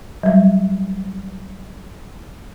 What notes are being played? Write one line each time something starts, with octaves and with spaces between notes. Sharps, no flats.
F#3 G3